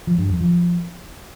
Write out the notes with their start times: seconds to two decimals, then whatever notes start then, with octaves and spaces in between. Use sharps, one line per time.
0.07 F3
0.18 G2
0.30 F2
0.41 F3